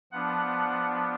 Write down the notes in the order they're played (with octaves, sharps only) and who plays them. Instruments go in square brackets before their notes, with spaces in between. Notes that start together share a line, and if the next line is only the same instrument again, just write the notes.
[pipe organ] F3 B3 D4 F#5